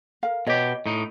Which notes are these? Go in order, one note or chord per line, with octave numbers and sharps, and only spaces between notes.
A#4 F5
B2 G4 C#5 D#5
A2 D#4